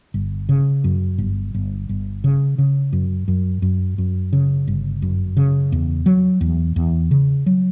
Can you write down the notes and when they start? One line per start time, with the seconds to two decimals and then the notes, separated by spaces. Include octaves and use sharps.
0.14 G1
0.49 C#3
0.84 F#2
1.18 G1
1.54 G1
1.89 G1
2.24 C#3
2.58 C#3
2.93 F#2
3.28 F#2
3.62 F#2
3.98 F#2
4.33 C#3
4.67 G1
5.02 F#2
5.37 C#3
5.72 E2
6.06 F#3
6.41 E2
6.76 E2
7.11 C#3
7.46 F#3